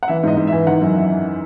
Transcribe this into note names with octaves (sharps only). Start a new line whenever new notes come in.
F#5
E3 E5
G#2 D#5
G#2
E5
E3
D#3 F#5
F#2
E5